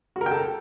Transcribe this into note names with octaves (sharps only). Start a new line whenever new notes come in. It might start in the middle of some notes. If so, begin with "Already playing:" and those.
F#4
A#4
G5
A4